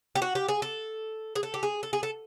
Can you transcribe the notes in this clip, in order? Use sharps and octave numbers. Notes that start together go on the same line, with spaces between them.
G4
F#4
G4
G#4
A4
G#4
A4
G4
G#4
A4
G#4
A4